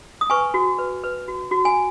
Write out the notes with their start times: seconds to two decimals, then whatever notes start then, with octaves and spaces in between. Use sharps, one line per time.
0.21 D#6
0.30 B4 G#5 C#6
0.54 F#4
0.79 B4
1.04 B4
1.28 F#4
1.51 F#4
1.65 G#5